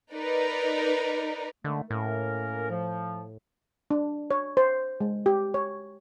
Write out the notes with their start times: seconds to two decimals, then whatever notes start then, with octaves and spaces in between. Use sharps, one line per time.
0.13 D#4 A#4 B4 D5
1.64 D3 D#3 G#3 A3
1.91 A2 A#3 C#4 A#4
2.70 F3
3.91 D4
4.31 C#5
4.57 C5
5.01 G#3
5.26 G4
5.54 C#5